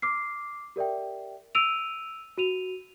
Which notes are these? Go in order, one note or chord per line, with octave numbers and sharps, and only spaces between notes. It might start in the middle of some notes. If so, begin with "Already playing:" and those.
D6 F6 C7
G4 A#4 D5 E5 G5
E6 D7 D#7 F7
F#4 D#7 F7